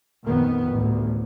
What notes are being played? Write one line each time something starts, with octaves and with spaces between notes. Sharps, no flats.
A#1 F2 D#3 B3
A1 D2